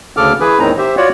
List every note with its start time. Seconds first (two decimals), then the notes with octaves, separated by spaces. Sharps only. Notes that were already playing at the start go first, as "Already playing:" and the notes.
0.17 D2 C#3 A4 D6 F6
0.40 E3 G#4 B4
0.59 E2 A2 D#3 C4 D#4 A#5
0.78 G4 C5 E5
0.97 F4 F#4 C#5 D5 F#5